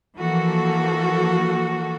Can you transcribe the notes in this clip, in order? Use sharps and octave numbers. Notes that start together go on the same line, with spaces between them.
E3 F3 A#3 F#4 A4